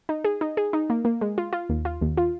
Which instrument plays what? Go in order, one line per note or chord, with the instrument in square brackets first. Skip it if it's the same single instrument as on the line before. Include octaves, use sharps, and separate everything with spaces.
[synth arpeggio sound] D#4
G#4
D#4
G#4
D#4
A#3
A#3
G#3
F4
F4
D#2
F4
D#2
F4